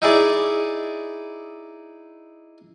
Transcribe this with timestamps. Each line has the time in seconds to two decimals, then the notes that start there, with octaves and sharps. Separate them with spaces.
0.02 D#4 E4 G#4 D5